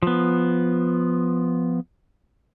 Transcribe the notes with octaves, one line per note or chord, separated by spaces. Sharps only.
F3 B3